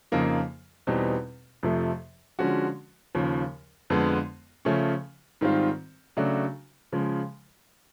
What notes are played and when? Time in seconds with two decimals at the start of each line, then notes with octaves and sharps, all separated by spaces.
0.12 F2 C#3 F3 A#3 D#4
0.87 E2 B2 G3 C4 D#4
1.63 F2 C3 F3 A3
2.39 D3 F3 G#3 C#4 F#4
3.15 D#2 C#3 F3
3.90 F2 D3 F3 G#3 B3
4.65 C#3 F3 A3 C#4
5.41 G#2 D#3 G3 C4 F4
6.17 C#3 F#3 A3 D4 F#4
6.92 C#3 F3 G#3